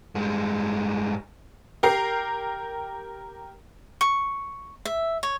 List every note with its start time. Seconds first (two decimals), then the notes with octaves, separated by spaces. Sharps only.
0.15 G2 G#3
1.83 G4 A#4 C7
4.01 C#6
4.85 E5
5.23 C#5